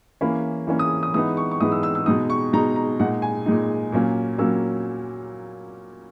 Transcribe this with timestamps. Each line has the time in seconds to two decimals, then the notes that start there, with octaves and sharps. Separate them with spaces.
0.21 E3 A#3 C#4 B5
0.67 E3 A#3 C#4
0.79 D#6
1.03 D#6
1.14 E3 G#3 B3 D#4 D#6
1.37 C#6
1.51 C#6
1.60 E3 G#3 B3 D#4 D#6
1.72 E6
1.83 E6
1.95 E6
2.06 B2 G#3 D#4 D#6
2.30 C#6
2.53 B2 G#3 D#4 A#5
2.76 A#5
3.00 A#2 G#3 D#4 F#5
3.22 G#5
3.46 A#2 G#3 D#4
3.92 A#2 F#3 A#3 C#4
4.38 A#2 F#3 A#3 C#4 E6